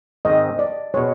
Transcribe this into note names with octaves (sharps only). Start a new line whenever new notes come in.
G#2 D#3 G#3 C4 D#5
D5
B2 G#3 C#5